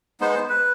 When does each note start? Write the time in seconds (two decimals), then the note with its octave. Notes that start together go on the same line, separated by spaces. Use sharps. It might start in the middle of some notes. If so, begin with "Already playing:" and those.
0.21 G#3 B3 D#4 C5
0.35 C5
0.49 B4